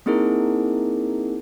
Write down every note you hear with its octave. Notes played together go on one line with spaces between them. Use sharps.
A#3 C4 D#4 E4 G#4 A#4